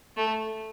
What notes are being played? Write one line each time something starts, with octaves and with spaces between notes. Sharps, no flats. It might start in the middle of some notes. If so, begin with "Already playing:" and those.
A3